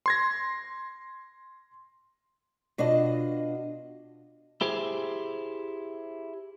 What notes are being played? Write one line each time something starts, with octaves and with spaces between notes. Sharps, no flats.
C6 G#6 A#6
B2 D4 F4 F#4 D#5
E4 G4 G#4 C5